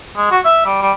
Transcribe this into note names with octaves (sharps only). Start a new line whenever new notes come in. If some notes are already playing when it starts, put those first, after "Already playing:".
G#3
F#4
E5
G3
G3